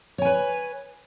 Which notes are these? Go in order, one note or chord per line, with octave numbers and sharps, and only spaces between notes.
B4 C#5 G#5